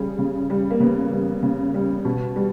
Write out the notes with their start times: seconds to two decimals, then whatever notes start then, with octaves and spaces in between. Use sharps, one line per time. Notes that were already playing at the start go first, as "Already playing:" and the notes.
Already playing: C#3 G3 G#4
0.19 C#3
0.50 G3
0.71 A#3
0.80 C#3 B3
1.12 G3
1.43 C#3
1.74 G3
2.05 B2
2.36 G3